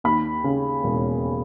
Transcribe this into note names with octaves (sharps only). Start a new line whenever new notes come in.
D#2 B5
C#3
E1